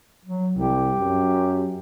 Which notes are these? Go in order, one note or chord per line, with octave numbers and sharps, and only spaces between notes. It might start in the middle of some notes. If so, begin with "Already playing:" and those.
F#3
C2 G4
F#2